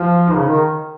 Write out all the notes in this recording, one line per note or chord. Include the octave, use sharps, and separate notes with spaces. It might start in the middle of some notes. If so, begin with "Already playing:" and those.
Already playing: F3 F4
D#4
C#3
D#3